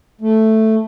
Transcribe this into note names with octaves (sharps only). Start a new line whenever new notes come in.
A3